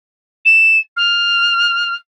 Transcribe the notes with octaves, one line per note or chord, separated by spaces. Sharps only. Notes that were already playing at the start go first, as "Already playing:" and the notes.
E7
F6